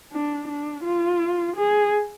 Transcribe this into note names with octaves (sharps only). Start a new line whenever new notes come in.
D4
D4
F4
G#4